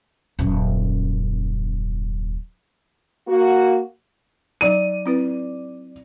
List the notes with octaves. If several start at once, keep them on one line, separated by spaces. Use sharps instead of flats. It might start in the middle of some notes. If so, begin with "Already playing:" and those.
D#1 F#2
A#3 F#4
F#3 D#4 D5 A#5 D#7
C4 E4 B4